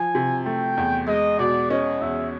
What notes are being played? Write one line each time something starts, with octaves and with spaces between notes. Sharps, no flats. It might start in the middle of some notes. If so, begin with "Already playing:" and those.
Already playing: F3 G#5
C3
A3 G5
E2
G#3 D#5
B2 D5
C#4 D#5
E2 E5